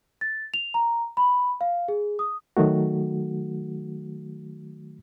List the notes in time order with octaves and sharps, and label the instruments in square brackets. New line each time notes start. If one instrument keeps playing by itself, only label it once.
[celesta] A6
F7
A#5
B5
F5
G#4
D#6
[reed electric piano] D#3 F#3 A3 F#4